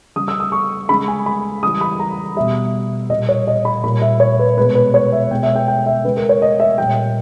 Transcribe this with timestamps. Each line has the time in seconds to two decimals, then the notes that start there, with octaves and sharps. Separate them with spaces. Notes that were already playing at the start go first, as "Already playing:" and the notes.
0.16 C#3 G3 D#6
0.28 E6
0.40 D#6
0.52 C#6
0.89 C#3 G#3 B5
1.08 G#5
1.26 B5
1.63 C#3 E3 G3 D#6
1.81 B5
2.00 A#5
2.36 B2 G3 E5
3.09 A#2 G3 D#5
3.29 C#5
3.47 D#5
3.65 B5
3.84 A#2 G3 B5
4.02 E5
4.20 C#5
4.39 B4
4.57 G#3 B4
4.61 B2
4.75 B4
4.94 C#5
5.12 E5
5.31 B2 G#3 G5
5.43 E5
5.56 G5
5.68 G5
5.86 E5
6.04 C#3 G#3 B4
6.17 A#4
6.29 C#5
6.42 D#5
6.60 E5
6.78 A#2 G3 G5